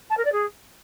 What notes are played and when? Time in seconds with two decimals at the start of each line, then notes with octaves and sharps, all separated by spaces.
0.10 A5
0.17 A#4
0.25 D5
0.32 G#4